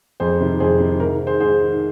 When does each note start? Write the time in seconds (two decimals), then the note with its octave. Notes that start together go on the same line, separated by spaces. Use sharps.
0.20 F2 G#4 C5
0.40 C3 D#3
0.60 F2 G#4 C5
0.80 C3 D#3
1.00 G#2 A#4
1.20 D#3
1.27 G#4 C5
1.40 G#2 G#4 C5
1.60 D#3